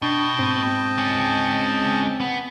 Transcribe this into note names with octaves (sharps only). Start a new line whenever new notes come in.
B2 D4 D#5 G5 A5
G#2 C4
G#3 C#4
B3